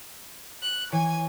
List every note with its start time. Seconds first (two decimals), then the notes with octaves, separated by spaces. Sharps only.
0.61 F#6
0.92 E3 C#5 G#5